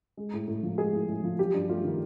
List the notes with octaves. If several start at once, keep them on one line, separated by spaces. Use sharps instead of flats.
G#3
A2
A2
F3
G#3 G#4
A2
A2
F3
F#3 G4
G2
A3 F4
D#3